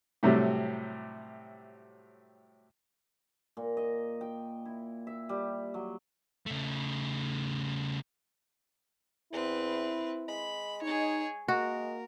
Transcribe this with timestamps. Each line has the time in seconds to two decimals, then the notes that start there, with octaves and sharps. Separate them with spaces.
0.23 A2 C3 F#3 G3 A3
3.57 A#2
3.77 D#5
4.21 G5
4.65 E4
5.07 E5
5.29 G3
5.74 F#3
6.46 C#3 A3
9.33 E2 C4 E4 B4
10.28 G#3 B5
10.82 D#4 G#4 C#5
11.48 G#3 A#3 F#4 A#4